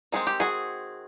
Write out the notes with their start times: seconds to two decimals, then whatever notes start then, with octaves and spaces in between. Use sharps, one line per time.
0.12 D#3 G#3 C4 G#4
0.27 G4
0.40 F#4 G#4